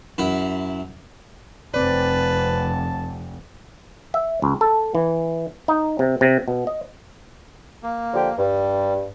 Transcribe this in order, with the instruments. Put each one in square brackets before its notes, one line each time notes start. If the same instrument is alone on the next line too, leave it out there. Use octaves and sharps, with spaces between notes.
[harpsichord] F#2 E4 B5
[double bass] F1 [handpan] C4 D5 [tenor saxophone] B4 [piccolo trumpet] A5
[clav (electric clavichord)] E5
C#2
A4
E3
D#4
C3
C3
B2
D#5
[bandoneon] A#3
[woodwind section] D3 F3 G4
[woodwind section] G2 [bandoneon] G3